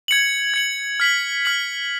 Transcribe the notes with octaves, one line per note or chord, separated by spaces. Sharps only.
G#6 C#7 F#7
G#6 C#7 F#7
F6 B6 F#7
F6 B6 F#7